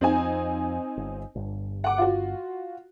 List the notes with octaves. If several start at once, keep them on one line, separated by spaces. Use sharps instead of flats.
F2 C4 D#4 G#5
G1
G1 G2
F#5 D6
F4 F#4